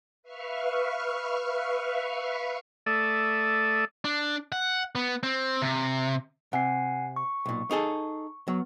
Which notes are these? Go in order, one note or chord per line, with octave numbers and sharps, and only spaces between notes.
B4 E5 F5 C#6 F6
A3 A4 D5 E5 D#6
D4
F#5
B3
C4
C3
C3 F#5 G#5 C7
C#6
B1 A#2
D#4 G#4 A4
F#3 B3